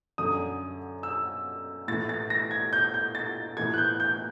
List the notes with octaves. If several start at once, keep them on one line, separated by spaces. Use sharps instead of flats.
F#2 D3 D#6
E6
A2 E3 A6
A6
A#6
G#6
G6
G6
A6
A2 E3 G#6
F#6
G6
G6